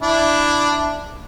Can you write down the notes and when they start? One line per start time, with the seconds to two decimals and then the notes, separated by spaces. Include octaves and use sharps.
0.02 D4 E4